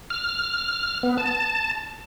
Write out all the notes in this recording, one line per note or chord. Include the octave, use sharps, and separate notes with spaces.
F6
B3
A5